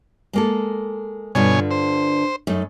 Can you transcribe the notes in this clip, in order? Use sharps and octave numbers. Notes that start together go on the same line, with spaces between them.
G#3 A#3 A4
G2 B2 D3 F4 C#5 G#5
C5
F#2 A3 D#4